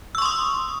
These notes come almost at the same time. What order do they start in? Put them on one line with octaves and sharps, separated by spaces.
E6 C#6 C6 D#6